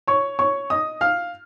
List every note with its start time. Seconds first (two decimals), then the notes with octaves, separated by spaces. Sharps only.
0.07 C#5 C#6
0.39 C#5 C#6
0.70 D#5 D#6
1.01 F5 F6